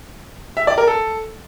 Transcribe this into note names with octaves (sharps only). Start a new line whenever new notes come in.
E5
D5
A#4
A4